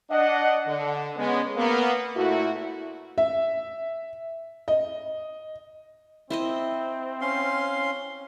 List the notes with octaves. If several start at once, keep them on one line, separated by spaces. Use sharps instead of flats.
D4 D#5 F#5
D3
G#3 B3 C#4
A#3 B3
A#2 A3 E4 F#4
E5
D#5
C4 E4 C5 D#5
C#4 F5 C6